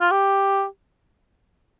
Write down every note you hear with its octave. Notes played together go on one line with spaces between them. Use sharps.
F4
G4